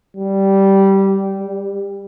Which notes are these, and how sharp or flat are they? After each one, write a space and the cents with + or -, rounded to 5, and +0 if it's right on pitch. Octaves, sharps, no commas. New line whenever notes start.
G3 -10
G3 +20